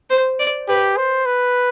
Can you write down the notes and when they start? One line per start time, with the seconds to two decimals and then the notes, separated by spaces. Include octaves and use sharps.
0.10 C5
0.39 D5
0.68 G4 B4
0.97 C5
1.26 B4